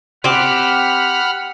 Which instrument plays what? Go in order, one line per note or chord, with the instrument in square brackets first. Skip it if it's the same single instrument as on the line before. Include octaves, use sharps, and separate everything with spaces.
[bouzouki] C4 G4 [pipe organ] F#5 B5 F6